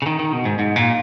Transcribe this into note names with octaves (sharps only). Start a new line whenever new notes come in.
C#3
D#3
D#3
B2
G#2
G#2
A#2